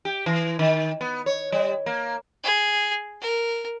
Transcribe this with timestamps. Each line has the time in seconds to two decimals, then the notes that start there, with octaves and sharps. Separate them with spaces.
0.05 G4
0.26 E3
0.59 D#3
1.01 B3
1.26 C#5
1.52 G3
1.86 A#3
2.43 G#4
3.21 A#4